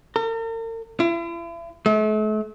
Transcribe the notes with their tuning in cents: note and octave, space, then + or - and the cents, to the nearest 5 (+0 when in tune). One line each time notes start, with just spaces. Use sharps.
A#4 -45
E4 +40
A3 -40